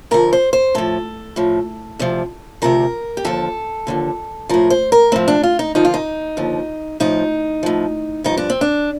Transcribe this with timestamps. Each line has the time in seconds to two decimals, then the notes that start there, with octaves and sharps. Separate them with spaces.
0.11 F2 D3 F3 A#4
0.33 C5
0.53 C5
0.75 A2 F3 A4
1.36 A2 F3
1.99 D2 C3 F3
2.62 D2 C3 F3 A#4
3.17 G4
3.25 D#2 D3 F3 A4
3.87 D#2 D3 F3
4.49 A2 F3 A#4
4.70 C5
4.92 A#4
5.12 A2 F3 C4
5.28 D4
5.43 F4
5.59 D#4
5.75 D#2 D3 F3 D#4
5.85 F4
5.94 D#4
6.37 D#2 D3 F3
7.00 A2 F3 D#4
7.63 A2 F3
8.24 G2 F3 D#4
8.37 D4
8.50 C4
8.61 D4